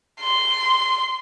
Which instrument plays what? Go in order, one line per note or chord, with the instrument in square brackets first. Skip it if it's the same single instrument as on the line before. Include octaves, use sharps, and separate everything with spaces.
[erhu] C6